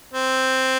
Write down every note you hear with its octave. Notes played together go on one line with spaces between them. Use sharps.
C4